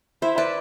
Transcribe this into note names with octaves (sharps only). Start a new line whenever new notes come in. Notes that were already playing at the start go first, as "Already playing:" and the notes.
E4 C5 E5
B4 D5